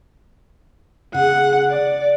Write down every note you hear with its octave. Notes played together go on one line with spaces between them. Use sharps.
C#3 G#4 F#5
D5